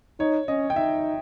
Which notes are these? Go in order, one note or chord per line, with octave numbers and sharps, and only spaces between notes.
D#4 C#5
C#4 D#5
G5
D#4 E5